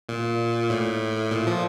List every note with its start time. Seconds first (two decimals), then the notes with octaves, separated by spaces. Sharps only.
0.09 A#2
0.70 A2
1.31 A#2
1.47 F3